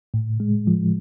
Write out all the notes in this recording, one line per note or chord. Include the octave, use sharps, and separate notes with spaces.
A2
G#3
F3